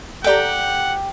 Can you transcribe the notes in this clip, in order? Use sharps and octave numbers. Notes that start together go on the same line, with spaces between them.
G4 A4 D5 F#5 G5 A#5